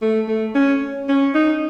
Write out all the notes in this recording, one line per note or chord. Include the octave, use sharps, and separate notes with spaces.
A3
A3
C#4
C#4
D#4